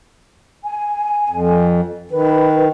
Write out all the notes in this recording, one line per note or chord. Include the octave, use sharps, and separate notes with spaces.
G#5
F2
D#3 B4